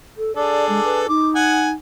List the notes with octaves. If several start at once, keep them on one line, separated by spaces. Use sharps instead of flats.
A4
D4 G#4 A4 D5
G#3
B4
D#4 D6
F#5 G#5